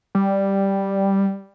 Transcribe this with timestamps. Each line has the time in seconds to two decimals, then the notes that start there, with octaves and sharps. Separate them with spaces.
0.15 G3